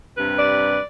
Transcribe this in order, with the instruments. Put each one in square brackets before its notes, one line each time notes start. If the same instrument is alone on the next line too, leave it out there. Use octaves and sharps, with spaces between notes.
[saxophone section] G2 C3 B4
[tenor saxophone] D5